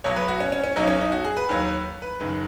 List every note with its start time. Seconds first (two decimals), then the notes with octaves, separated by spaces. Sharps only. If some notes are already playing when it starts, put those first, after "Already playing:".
0.04 B1 B2 F#3 C#5
0.16 B4
0.28 F#4
0.40 C#4
0.52 C#4
0.64 C#4
0.76 B1 B2 F#3 D#4
0.88 C#4
1.01 D#4
1.12 F#4
1.24 G#4
1.37 B4
1.49 D#2 D#3 F#3
2.02 B4
2.20 F#1 F#2 D#3 B4